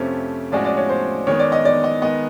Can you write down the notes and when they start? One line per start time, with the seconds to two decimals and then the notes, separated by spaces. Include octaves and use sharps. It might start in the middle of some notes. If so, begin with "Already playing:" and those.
Already playing: F2 C3 F3 A3 C#4
0.52 A2 F3 G#3 C#4 F#4 D5
0.65 D5
0.77 C#5
0.89 C5
1.27 D#3 G#3 B3 C#5
1.39 D5
1.52 D#5
1.65 D5
1.84 D#5
2.02 D#3 G#3 B3 D#5